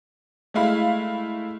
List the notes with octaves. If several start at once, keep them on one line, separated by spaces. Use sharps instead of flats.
G#3 A3 E4 F5 B5